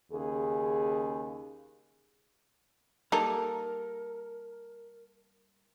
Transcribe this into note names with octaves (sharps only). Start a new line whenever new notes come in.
D#2 C#3 G#4
G3 A#3 D#4 A4 A#4